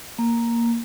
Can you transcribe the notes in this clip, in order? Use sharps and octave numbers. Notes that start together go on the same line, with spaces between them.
A#3